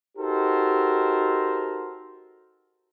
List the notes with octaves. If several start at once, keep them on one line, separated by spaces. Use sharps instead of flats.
D#4 F#4 G4 A4 A#4 C5